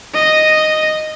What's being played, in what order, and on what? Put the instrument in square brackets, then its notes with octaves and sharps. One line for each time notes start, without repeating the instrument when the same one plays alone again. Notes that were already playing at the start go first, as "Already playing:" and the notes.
[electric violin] D#5